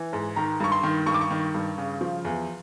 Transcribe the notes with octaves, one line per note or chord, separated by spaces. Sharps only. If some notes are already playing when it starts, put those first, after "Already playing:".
Already playing: E3
G#2
D#3 A#5
G2 C#6
C6
D#3
G2 C#6
D6
C#6
D#3
G2
C#3
F3
E2